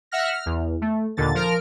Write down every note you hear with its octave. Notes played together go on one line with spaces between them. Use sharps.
E5 F#5 F6 A#6
F6
E2
A3
D#2 A#2 D3 A6
F3 A#4 F6 D7